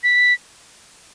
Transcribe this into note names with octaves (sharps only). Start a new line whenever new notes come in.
B6